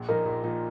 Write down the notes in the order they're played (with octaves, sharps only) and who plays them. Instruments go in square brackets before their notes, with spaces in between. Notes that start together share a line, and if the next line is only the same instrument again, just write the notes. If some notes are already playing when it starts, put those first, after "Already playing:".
Already playing: [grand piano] A#1
[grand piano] A#2 F3 D#4 [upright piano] A#4
[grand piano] A#1
A#2 F3 D#4